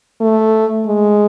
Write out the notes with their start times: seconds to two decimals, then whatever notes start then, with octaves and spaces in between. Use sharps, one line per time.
0.21 A3
0.86 G#3